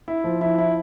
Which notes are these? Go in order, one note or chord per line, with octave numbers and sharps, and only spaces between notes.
E4
F3
E4
E4